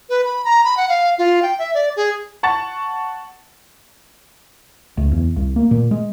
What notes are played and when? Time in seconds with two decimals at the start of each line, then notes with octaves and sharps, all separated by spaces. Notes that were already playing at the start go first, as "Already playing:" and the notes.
0.10 B4
0.25 B5
0.45 A#5
0.64 B5
0.77 F#5
0.89 F5
1.18 F4
1.42 G5
1.59 E5
1.74 D5
1.96 G#4
2.43 F#5 A5 C#6 A6
4.98 C#2
5.11 E2
5.37 C2
5.56 A#3
5.71 A#2
5.91 G#3